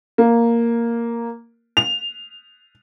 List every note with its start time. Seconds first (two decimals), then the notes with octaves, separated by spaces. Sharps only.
0.18 A#3
1.77 F7